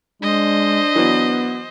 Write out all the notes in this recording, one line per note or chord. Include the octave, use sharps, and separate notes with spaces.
G#3 D4 C5 D#5
E3 F#3 B3 B4